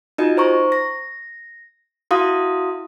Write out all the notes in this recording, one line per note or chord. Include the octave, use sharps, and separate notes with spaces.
D#4 F4 F#4 D#5
C5 A#5 C#6
A#6
E4 F#4 F5 C6 D#6